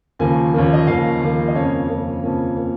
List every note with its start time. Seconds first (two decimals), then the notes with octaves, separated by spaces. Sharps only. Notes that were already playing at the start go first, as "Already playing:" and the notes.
0.19 D#2 C#3 F3 A#3 G#5
0.54 D#2 C#3 F3 A#3 C#5
0.73 D#5
0.87 D#2 C#3 F3 A#3 F5
1.21 D#2 C#3 F3 A#3
1.48 D#5
1.55 F2 C#3 A#3 C#4 C#5
1.88 F2 C#3 A#3 C#4
2.23 F2 C#3 A#3 C#4
2.57 C#3 A#3 C#4